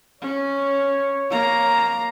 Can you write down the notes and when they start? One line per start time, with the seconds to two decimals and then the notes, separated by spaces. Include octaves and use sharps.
0.21 C#4 C#5
1.30 A#3 A#5